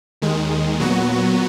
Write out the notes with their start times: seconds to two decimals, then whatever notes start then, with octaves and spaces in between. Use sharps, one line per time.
0.22 D#2 D#3 G#3
0.80 A#2 F#3 B3 F#4